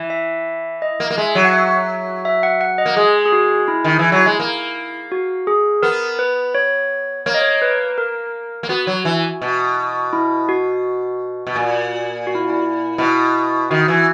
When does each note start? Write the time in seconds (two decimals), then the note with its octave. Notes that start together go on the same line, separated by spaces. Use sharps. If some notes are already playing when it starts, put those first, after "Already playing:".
Already playing: E3
0.10 E5
0.82 D#5
1.00 A#3
1.11 A#3
1.18 G#3 E5
1.35 F#3
1.45 F#5
1.53 E5
2.25 E5
2.43 F#5
2.61 F#5
2.78 D#5
2.86 A#3
2.97 G#3 G#4
3.26 G#4
3.32 F#4
3.68 E4
3.85 D#3
3.99 E3
4.12 F#3
4.26 G#3
4.40 A#3
5.12 F#4
5.47 G#4
5.83 B3 A#4
6.19 B4
6.55 C#5
7.26 A#3 C#5
7.34 D#5
7.42 C#5
7.62 B4
7.98 A#4
8.63 A#3
8.69 B3 F#4
8.87 F#3
9.05 E3
9.42 B2
10.13 E4
10.49 F#4
11.47 B2
11.56 A#2
12.27 F#4
12.35 E4
12.50 E4
12.98 B2 E4
13.70 D#3 F#4
13.88 E3